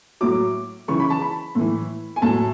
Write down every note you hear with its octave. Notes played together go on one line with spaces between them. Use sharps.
A2 F#3 D6
C#3 E3 C#6
B5
A5
B5
A2 E3
G#5
A2 F#3 A5